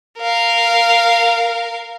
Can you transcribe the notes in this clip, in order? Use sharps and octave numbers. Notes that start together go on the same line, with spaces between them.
A#4 F5